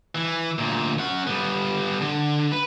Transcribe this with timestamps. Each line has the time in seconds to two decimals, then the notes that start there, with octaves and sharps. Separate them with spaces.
0.15 E3
0.59 D2 A#2
0.99 C#4 F#5
1.27 G3 B3
2.01 D3
2.52 B4